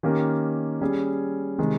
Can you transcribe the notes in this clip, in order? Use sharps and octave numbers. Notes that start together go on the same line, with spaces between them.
D#3 A#3 C#4 G4 A#4
G3 C#4 G#4
C3 D#3 G#3